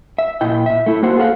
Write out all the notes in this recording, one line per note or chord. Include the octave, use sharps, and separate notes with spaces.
E5
A#2 E4 D#5 G5
A#2 E5
A3 E4
A#3 F#4 C5 F#5
G#4 A4 C5 C#5 F5 F#5